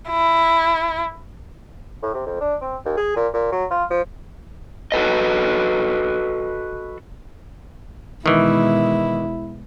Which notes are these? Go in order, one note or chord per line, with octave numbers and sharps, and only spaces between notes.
E4
A2
C3
F2
D4
C4
D#2
G#4
A#2
A#2
F#3
F4
F3
F#4 A4 B4 D#5
B2 D#3 E3 G#3 E4